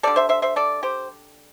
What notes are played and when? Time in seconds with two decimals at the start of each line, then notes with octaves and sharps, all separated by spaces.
0.03 D3 G3 A4 D5
0.16 C5 E5
0.29 C5 E5
0.42 C5 E5
0.56 A4 D5
0.83 G4 C5